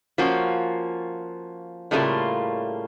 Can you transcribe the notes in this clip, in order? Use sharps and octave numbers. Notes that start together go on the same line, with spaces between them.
F3 A#3 C#4 F4 F#4
A2 C#3 G3 A3 A#3 F4